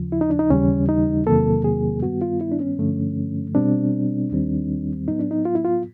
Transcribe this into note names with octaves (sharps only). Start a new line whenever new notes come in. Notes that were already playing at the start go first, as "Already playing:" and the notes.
Already playing: D#2 C#3 F3
E4
D#4
D4
D#4
D#2 C#3 E3 G3 C#4
D#4
E2 C3 D#3 F#3 A#3 A4
G#4
G2 D#3 G3 B3 F#4
F4
E4
D4
C#4
G2 D3 F3 A3
B2 G3 C4 D4
D#2 D#3 G3 C4
A2 F#3 B3 D#4
D4
D#4
F4
E4
F4